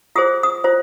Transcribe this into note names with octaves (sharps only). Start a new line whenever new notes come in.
F4 G#4 C5 D#6
D#6
F4 C5